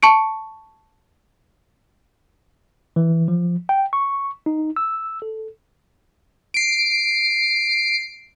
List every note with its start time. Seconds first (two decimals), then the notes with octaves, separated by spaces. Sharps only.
0.03 A5 C#6 C#7 D7
2.96 E3
3.28 F3
3.69 G5
3.93 C#6
4.46 D#4
4.76 E6
5.22 A4
6.54 C7 D7